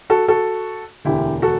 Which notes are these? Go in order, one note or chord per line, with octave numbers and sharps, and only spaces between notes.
F#4 A4
F#4 A4
E1 D2 D3 E4 G4
F#4 A4